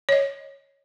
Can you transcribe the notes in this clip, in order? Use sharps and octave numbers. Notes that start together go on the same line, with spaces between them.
C#5 D#5